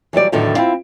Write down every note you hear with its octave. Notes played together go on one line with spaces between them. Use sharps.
E3 F#3 G3 D5
E2 A2 D3 D#3 F#3 A3
C4 E4 F4 F5